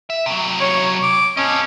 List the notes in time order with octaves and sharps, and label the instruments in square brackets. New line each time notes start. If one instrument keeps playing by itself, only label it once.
[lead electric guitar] E5
C3 F#3
[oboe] C#5
D6
[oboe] C#4 [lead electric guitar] A4 D#5